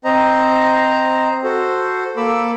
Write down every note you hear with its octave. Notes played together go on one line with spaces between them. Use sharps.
C4 C5 D#5 A#5
F#4 A4 C5
A#3 A4 B5 D6 E6